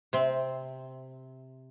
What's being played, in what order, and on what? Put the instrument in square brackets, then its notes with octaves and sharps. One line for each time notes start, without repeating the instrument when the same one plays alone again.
[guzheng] C3 C4